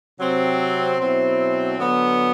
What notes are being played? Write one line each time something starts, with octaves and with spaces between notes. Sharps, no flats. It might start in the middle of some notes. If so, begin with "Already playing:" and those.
C3 F#3 C4
B2 F#3 C4 E4
D3 F#3 B3